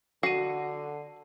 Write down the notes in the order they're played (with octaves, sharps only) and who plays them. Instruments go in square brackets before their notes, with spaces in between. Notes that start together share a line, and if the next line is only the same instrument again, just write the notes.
[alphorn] D3 [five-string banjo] F#4 F#5 [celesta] C7 D#7